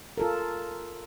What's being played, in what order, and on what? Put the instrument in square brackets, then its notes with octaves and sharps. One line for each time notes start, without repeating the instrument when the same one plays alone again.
[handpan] F4 A4 A#4